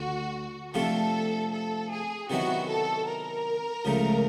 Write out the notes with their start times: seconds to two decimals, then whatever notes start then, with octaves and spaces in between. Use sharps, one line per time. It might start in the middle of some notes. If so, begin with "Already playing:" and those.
Already playing: D2 D3 F#4
0.74 C3 F3 A3 D4 F4 A4
1.52 A4
1.91 G#4
2.30 C3 D#3 F#3 B3 E4 F#4
2.68 A4
3.07 A#4
3.85 C#2 C#3 F3 A3